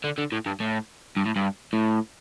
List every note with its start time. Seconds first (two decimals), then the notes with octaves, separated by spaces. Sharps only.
0.04 D3
0.18 D3
0.32 A2
0.46 G2
0.60 A2
1.17 G2
1.26 A2
1.36 G2
1.73 A2